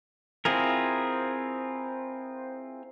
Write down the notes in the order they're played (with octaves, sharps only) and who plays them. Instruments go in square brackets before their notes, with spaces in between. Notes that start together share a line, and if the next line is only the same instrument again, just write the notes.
[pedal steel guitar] C4 E4 F4 G#4 A#4